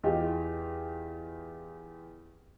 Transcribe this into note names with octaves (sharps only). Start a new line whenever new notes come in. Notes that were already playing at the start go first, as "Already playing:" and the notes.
E2 F4 G4 D#5